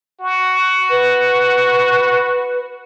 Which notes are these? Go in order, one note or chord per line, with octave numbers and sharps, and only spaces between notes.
F#4
B4